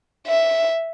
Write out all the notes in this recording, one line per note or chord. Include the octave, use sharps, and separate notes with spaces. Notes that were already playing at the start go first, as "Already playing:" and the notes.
E5